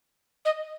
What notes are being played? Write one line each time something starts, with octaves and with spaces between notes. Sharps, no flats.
D#5